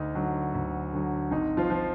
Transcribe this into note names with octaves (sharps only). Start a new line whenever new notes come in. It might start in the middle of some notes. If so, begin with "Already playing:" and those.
Already playing: D2 D#4
D3 F#3
D2
D3 F#3
G#1 D#4
F3 F4
F3